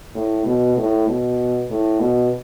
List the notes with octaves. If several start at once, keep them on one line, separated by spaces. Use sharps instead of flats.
A2
B2
A2
B2
A2
B2